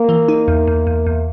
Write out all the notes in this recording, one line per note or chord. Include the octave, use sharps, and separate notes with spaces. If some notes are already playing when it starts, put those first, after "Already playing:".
Already playing: A#3
E3
D#4
E2
E2
E2
E2